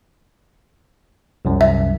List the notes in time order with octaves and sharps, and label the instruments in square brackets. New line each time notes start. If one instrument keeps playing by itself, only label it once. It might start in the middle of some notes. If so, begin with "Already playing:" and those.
[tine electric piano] C2 F#2
[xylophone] E5